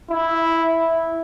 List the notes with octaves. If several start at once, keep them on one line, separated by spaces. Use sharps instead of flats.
E4